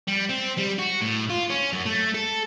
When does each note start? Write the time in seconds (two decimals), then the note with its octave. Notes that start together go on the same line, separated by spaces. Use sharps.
0.07 G3
0.29 C4
0.58 G3
0.78 F#4
1.01 A2
1.30 F4
1.50 C#4
1.73 F#2
1.86 A3
2.14 A4